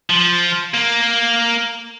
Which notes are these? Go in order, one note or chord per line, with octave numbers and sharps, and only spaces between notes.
F3
A#3